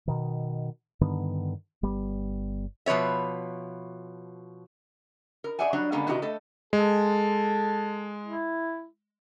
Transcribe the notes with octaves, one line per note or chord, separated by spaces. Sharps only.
B2 D#3
G2 D3 D#3 B3
G1 G3 B3
B2 F3 B4 C#5 E5
A#4
G#4 C5 D5 E5 F#5 G#5
F#3 G3 D4 C#5
D3 G3 G#3 A#3 B3 C#4
C3 D#3 E4 F#4 G4 D#5
A3 A4 D#5
G#3 A4
E4